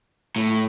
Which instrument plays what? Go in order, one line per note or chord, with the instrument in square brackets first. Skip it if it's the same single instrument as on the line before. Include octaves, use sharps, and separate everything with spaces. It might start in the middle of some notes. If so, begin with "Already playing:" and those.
[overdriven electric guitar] A2